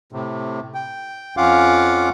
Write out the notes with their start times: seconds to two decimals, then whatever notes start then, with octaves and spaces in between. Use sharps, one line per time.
0.13 A2 C3
0.74 G5
1.37 F2 C#4 F4 F5 F#5 D6